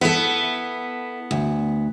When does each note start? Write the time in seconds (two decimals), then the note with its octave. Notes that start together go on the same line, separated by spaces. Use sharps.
0.01 B3 E4 A4
1.31 D2